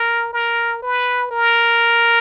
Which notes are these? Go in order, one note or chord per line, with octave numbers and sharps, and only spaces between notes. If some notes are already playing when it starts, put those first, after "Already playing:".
Already playing: A#4
A#4
B4
A#4